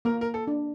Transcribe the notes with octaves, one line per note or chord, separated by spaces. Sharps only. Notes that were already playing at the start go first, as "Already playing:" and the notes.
A#3 A#4
A#4
A4
D4